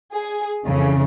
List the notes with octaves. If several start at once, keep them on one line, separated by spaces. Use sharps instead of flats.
G#4
F2 C#3 E3 A3